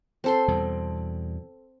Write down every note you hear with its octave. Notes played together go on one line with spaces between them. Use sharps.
C4 A4 C6
E2 B2 G3